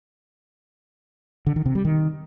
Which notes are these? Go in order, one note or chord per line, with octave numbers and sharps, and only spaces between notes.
D3
D#3
C3
G3
D#3